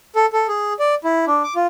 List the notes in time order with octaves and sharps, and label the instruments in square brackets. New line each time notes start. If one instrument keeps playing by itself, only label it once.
[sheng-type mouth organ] A4
A4
G#4
D5
E4
D4
D6
F4